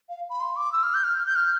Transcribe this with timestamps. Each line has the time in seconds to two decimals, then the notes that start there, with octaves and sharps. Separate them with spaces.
0.09 F5
0.30 B5
0.41 C6
0.56 D6
0.72 E6
0.83 F6
0.94 G6
1.04 F6
1.26 G6
1.36 F6